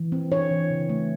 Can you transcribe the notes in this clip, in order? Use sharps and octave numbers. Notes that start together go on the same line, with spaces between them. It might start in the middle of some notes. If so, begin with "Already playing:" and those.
Already playing: E3
C4
D4 C#5
E3
C#3
A3